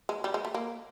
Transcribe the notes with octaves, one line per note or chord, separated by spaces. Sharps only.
G#3
G3
G#3
A3
A#3